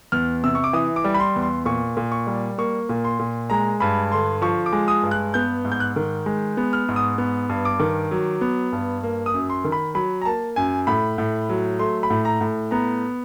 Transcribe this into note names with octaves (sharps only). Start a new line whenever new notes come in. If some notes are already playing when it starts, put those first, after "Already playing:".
E2 F6
C3 E6
C#6
D6
E3 D#6
D6
G3
B5
C6
E2
C6
A#2 C#6
A#2
C#6
G3
A#3 C#6
A#2
C6
A#2
G#3 A#5
G2 B5
D3 C6
F3 C#6
D6
G#3
D#6
G2
F#6
B3 G6
G#2
G6
F#6
D#3
G#3
B3
F6
G#2
D#6
B3
G2
D6
D#3
F#3
B3
G2
A#3
D#6
F#2
C6
D#3
B5
F#3 B5
A#5
A#3 A5
F#2 G#5
A2 B5
A2
F#3
A3 C6
B5
A2
A#5
A2
B3 A#5